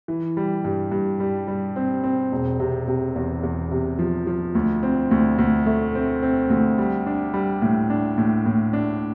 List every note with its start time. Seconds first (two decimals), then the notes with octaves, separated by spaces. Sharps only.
0.08 E3
0.37 G3
0.64 G2
0.91 G2
1.20 G3
1.48 G3
1.76 C4
2.04 C4
2.32 E1
2.60 C3
2.88 C3
3.16 E2
3.43 E2
3.72 C3
3.99 F3
4.27 F3
4.55 D2
4.83 C4
5.11 D2
5.39 D2
5.66 A3
5.95 C4
6.22 C4
6.50 D2
6.78 G3
7.07 D4
7.34 G3
7.62 A2
7.90 D4
8.18 A2
8.46 A2
8.73 D4